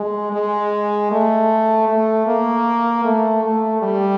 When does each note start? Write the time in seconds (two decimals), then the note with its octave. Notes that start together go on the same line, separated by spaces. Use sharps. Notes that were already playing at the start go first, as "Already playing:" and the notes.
Already playing: G#3
0.33 G#3
1.11 A3
1.88 A3
2.27 A#3
3.04 A3
3.44 A3
3.82 G3